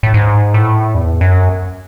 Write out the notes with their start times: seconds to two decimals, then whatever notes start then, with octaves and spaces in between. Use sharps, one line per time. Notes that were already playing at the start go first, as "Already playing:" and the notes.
0.03 A2
0.14 G#2
0.54 A2
0.95 E2
1.21 F#2